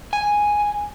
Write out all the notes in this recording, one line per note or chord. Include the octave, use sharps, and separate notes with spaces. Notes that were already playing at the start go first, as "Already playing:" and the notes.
G#5